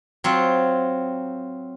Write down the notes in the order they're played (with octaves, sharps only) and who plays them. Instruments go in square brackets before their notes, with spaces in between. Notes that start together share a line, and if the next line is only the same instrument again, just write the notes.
[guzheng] F#3 C4 F4